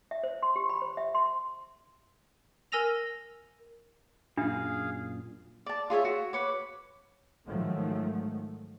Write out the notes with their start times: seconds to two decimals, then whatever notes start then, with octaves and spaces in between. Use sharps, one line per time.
0.11 E5
0.24 C5
0.42 C6
0.56 G4
0.69 B5
0.82 C5
0.97 E5
1.15 C6
2.72 A#4 G#5 E6 A#6 F7
4.38 F#2 A#2 D4 G#4 F5
5.66 D5 A5
5.90 F4 G#4 C#5 E5
6.05 F#4
6.33 B4 C#5 D6
7.47 G#2 D#3 F3 F#3 A3